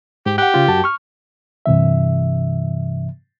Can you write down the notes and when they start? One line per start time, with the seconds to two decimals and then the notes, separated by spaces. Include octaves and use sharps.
0.26 G#2 G4
0.38 G4 F#5 F#6
0.54 C#3 F4
0.68 F#2 F#4 A5
0.84 C#6 F6
1.66 G2 C3 E3 E5